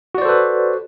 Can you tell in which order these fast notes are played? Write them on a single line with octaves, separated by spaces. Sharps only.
F#4 D5 C5 A4 B4